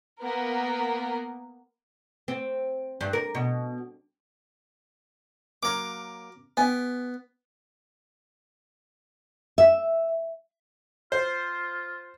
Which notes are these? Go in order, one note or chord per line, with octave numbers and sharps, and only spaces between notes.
A#3 B3 A#4
C4
G2
A#4
B2
F#3 A#3 A#4 D6
B3 G4 G5 G#5
E5
F4 C5